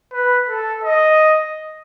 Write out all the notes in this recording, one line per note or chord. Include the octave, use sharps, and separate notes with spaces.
B4
A4
D#5